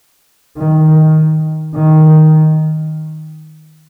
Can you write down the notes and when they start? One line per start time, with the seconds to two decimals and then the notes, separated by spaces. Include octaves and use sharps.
0.58 D#3
1.75 D#3